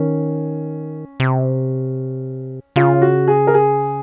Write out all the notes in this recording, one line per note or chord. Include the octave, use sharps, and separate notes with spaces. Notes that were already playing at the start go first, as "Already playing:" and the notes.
Already playing: D#3 C#4
C3
C#3 F4
F#4
G#4
A#4
G#4